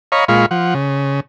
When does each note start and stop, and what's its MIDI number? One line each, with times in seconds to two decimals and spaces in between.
0.12 0.25 73
0.12 0.25 75
0.12 0.25 77
0.12 0.25 82
0.12 0.25 83
0.12 0.25 85
0.28 0.46 46
0.28 0.46 56
0.28 0.46 65
0.28 0.46 77
0.28 0.46 83
0.28 0.46 85
0.51 0.74 53
0.51 0.74 78
0.74 1.20 49